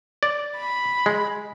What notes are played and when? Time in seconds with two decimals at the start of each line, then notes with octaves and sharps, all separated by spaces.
0.23 D5
0.57 B5
1.06 G#3